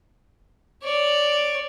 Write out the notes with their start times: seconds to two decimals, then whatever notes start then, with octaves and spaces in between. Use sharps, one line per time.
0.83 C#5 D5